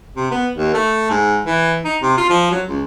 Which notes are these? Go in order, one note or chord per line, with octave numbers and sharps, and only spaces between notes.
C3
B3
D#2
A3
G#2
E3
D#4
C3
F4
F3
F#3
C#2